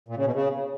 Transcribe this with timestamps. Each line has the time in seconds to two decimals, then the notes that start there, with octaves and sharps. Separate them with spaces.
0.09 A#2
0.17 C#3
0.26 B2
0.34 C#3